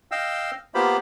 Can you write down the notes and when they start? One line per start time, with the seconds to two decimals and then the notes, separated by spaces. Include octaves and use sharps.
0.11 D#5 F5 G5 E6
0.75 A#3 B3 F4 G4 C5 B5